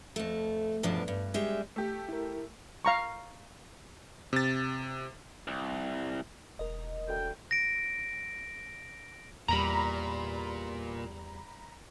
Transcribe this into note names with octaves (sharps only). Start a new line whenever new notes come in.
F2 A3
E2 G2 B2 F3 D4
G2
G3 G#3 E5
A3 G4
E4 A#4
F5 A#5 C#6
C3 A6
C2
E1 A#4 D#5
D2 G5
A#6 D7
E2 A#2 G3 A#5 B5